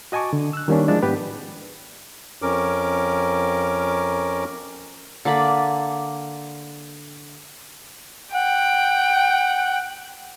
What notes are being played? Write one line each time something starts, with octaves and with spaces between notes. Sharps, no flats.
F#4 D#5 G#5 A5 C#6 D6
D3
E6 F#6
D#3 G3 A#3 C#4 D4
F3 G#3 D4 E4 D5
G#2 B3 G4 B4
F2 C#4 A#4 D6
D3 A#3 D5 B5
F#5 G5